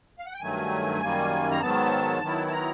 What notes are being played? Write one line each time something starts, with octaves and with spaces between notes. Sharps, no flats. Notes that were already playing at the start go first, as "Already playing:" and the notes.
F5
F#5
G5
G2 D#3 F#3 A3 G#5
F#2 D#3 G3 A#3
A#5
G#2 D#3 F#3 B3 A5
D#3 F#3 B3 E4
A5
A#5